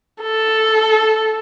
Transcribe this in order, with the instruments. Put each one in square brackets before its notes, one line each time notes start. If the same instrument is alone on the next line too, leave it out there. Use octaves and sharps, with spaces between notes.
[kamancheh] A4